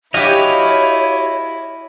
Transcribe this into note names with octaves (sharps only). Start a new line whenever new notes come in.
E4 F#4 G4 C#5 D#5 F5 G#5